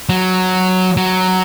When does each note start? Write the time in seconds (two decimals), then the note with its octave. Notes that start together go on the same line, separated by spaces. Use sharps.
0.09 F#3
0.97 F#3